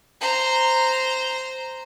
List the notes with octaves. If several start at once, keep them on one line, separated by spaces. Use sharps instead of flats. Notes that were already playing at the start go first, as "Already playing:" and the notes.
C5 A#5